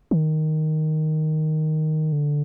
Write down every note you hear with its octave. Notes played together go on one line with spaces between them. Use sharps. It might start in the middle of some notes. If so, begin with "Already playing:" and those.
D#3
D3